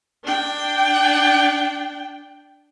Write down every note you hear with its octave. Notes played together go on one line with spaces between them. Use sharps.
D4 G5